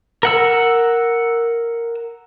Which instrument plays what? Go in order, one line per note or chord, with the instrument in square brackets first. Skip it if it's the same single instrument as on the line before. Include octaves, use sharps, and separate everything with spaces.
[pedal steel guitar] A#4 F#5 E6